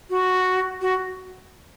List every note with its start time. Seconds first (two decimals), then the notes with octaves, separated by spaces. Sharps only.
0.10 F#4
0.81 F#4